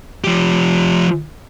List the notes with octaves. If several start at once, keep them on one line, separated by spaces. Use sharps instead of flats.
F3 G4